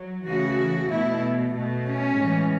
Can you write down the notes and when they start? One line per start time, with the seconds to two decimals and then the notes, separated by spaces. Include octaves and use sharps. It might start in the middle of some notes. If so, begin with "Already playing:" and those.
Already playing: F#3
0.26 C#3 E3 A3 F#4
0.90 B2 A3 E4
1.54 B2 A3
1.85 C#4
2.18 A2 E3 G#3